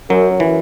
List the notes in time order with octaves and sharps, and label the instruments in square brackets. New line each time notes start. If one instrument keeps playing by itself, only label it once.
[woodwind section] F#2 [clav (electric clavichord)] F#3
[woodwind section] F#2
[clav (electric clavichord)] E3